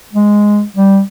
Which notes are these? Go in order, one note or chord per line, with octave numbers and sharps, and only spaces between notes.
G#3
G3